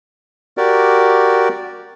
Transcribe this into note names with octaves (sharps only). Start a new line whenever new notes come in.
F#4 G4 A#4 D5